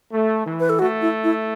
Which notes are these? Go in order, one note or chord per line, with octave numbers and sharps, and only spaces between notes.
A3
E3
B4
A4
A3 F#4
E4
E4